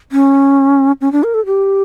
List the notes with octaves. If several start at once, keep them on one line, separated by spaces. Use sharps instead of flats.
C#4
C#4
D4
A#4
A4
G4